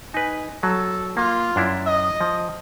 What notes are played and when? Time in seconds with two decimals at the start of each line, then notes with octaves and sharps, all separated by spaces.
0.14 D#4 B4 G#5
0.63 F#3 A4
1.17 A#3 F4
1.56 F#2 D4 E4
1.87 D#5
2.21 F3